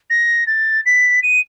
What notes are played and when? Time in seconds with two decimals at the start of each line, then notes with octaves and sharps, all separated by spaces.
0.10 A#6
0.47 A6
0.86 B6
1.23 D#7